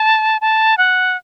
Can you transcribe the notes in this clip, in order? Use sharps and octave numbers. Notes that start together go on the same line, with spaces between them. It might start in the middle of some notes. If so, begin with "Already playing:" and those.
Already playing: A5
A5
F#5